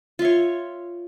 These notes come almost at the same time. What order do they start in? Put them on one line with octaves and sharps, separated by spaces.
F4 E5 C#5